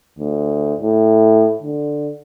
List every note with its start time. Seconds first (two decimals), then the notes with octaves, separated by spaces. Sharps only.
0.19 D2
0.81 A2
1.62 D3